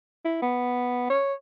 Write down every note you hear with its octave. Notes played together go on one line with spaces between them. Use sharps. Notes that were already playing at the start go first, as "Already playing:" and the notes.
E4
B3
C#5